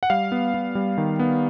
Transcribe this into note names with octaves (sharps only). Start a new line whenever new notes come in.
F#5
G3 F5
B3
B3
G3
D#3
B3